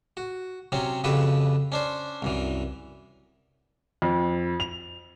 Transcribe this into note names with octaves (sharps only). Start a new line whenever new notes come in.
F#4
C3 F#3 C4 C#4
F2 C#3 F#4 G4 B4 E5
C#4 D4 C5
C2 F#2 E3
F2
F7